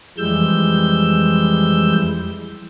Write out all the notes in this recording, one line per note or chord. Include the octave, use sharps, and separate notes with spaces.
F2 E3 G3 G#3 E6 G6